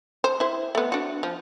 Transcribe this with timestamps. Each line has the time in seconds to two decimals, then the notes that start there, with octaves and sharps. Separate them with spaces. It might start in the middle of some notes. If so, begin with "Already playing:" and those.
0.24 C5
0.40 E4 C5
0.75 A3 B3
0.92 D4 F#4
1.23 F3